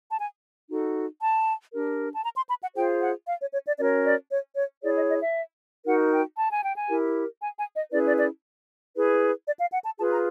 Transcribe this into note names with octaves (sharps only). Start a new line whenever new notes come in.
A5
G#5
D#4 F#4 A4
A5
D4 G4 A#4
A5
A#5
C6
B5
F#5
F4 G#4 C5 G5
F#5
F5
C#5
C#5
D5
C#4 F#4 A#4 C#5 D5
D5
C#5
C#5
E4 G#4 C#5 D5
D#5
D#5
E5
D#4 F#4 A#4 F#5
G5
A5
G#5
G5
G#5
E4 G4 A#4
G#5
G#5
D#5
C#4 E4 G#4 B4 D5
D5
D5
E4 G#4 B4
D5
F5
F#5
A5
F4 G#4 B4 A5
A#5